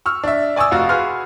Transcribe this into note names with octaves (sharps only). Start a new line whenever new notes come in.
C#6 E6 F6
D4 E5
D5 G#5 C#6 D#6 E6
F1 F4 F#4 F5
F#4 G#4 B4 C6 F6